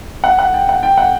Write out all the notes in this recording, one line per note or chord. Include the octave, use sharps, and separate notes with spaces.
F#5
F#5
G5
F#5
G5
F#5